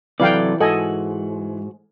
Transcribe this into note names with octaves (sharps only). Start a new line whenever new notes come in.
C3 E3 F#3 A4 B4 D5 F5 G5
G#2 F#4 A4 D#5 G#5